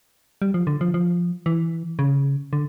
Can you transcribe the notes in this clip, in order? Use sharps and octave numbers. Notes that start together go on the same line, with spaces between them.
G3
F3
D3
F3
F3
E3
C#3
D3